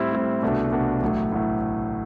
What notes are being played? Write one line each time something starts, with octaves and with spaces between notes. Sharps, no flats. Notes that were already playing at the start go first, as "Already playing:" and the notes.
Already playing: A2 G3 C4 E4
A2 G3 C4 E4
C2 B2 A3 D4 F#4
C2 B2 A3 D4 F#4
A1 A2 F#3 A3
A1 A2 F#3 A3